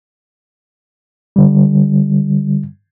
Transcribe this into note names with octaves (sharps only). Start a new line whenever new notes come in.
D3 G3